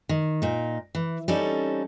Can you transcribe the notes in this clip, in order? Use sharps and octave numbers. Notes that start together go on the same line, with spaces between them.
D#3
A#2 D#4
E3
G3 C4 C#4 D#4 A4